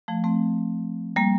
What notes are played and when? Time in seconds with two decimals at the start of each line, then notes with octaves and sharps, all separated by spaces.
0.08 F3 A3
0.24 A3 C4
1.16 G3 A#3